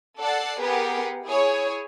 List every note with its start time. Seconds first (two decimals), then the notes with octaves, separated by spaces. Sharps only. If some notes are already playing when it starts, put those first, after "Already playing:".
0.20 A4 D5 F#5 A6 C7
0.60 B3 G4 G#4 A#4 B4 F#5
1.26 E4 G#4 C#5